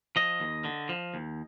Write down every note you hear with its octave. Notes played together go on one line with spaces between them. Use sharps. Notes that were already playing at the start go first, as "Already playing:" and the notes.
F3 D#5
D#2
D3
F3
D#2